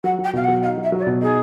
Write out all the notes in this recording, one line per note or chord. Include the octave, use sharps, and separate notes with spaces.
F#3 F#5
F#3 G5
B2 F5
F#5
F#3
D#4 F5
F#3
E5
F#3
C#5
D5
B2
D#4 G#4